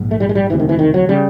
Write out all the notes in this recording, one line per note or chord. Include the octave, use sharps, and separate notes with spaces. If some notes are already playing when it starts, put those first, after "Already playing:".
Already playing: A#1 G#2
A3
G3
G#3
G3
E1 D2 C3 E3
D#3
E3
D#3
F#3
C#3 G3